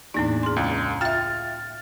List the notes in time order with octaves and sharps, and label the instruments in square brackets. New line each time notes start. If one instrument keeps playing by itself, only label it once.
[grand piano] E2 D4 [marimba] A2 A#3 D#4
[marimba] G#4 C6
[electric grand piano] C#2
[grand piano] F4 [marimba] E5 G5 [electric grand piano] F6 A6